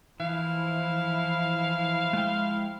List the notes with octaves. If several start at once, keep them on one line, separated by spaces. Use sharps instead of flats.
E3 F3 E4 F5
G#3 E5 G5